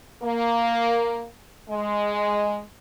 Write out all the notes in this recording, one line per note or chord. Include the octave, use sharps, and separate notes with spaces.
A#3
G#3